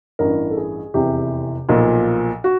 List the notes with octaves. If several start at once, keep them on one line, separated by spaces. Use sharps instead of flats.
A1 G2 E3 A#4
A4
G#4
F1 E2 C3 E3 G4
B1 A#2 F3
F#4